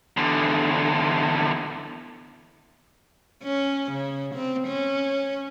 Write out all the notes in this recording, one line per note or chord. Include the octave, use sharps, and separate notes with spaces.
E2 D3
C#4
C#3
C4
C#4